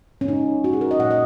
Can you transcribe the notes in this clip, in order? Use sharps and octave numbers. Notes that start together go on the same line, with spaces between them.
C#4
C#3 G#3 D#4
F#4
G#4
A#4
D#5
A#2 F#3 A#3 F#5
D#5